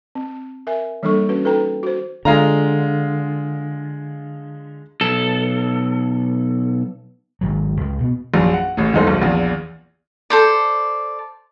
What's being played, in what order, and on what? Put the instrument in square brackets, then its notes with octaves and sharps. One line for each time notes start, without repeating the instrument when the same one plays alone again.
[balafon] C4
A#4 E5 G#5
E3 G3 A#3 D4 A4 C#6
C#4 F#4 B4
D#4 A4 B4 G5 A#5
F#4 C5
[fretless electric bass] D3 [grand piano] G#3 F4 A#5
[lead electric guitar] B1 A4
[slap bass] G#1 G#2 F#3
C#2 G#3
B2 B3
[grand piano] A#1 F#2
F#5
A1 A2
F#1 E2 G#3 D#4 A4 C5
B1
A#1 E2
[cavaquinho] A4 C5 D5